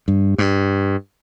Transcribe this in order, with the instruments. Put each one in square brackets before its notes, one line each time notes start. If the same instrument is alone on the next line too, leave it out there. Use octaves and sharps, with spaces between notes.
[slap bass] G2
G2